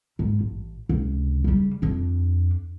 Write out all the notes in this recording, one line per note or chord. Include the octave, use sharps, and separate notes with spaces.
G#2
A1
C#2 C3
C#3 G3
F2 D4